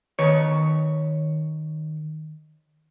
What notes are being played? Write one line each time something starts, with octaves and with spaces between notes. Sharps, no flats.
D#3 B4 C#5